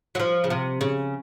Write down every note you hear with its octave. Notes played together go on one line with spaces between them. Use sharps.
F#3
F3
C#3
C3
C#3